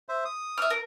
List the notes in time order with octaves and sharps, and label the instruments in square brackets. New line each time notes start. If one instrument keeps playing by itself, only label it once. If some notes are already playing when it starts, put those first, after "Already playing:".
[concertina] C5 E5
D#6
[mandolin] E5 F6
A#4